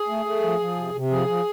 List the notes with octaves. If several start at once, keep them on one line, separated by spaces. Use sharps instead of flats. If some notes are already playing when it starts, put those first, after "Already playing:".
Already playing: G#4
A3
A3
F3
F3
C3
C3
F3 G#4
F3